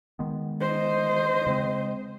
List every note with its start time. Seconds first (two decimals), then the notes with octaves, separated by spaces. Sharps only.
0.19 D#3 G#3 B3
0.61 C5 D#5
1.47 C#3 G#3 C4